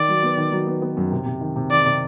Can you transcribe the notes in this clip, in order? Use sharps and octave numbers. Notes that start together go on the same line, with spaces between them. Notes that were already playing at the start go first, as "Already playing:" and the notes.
Already playing: D#3 D5
F#3
B3
D#3
F#3
B3
B3
F#2
C3
C3
D#3
C3
D#3 D5
C3